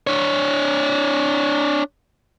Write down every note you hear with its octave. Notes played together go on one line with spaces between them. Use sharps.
D4 C#5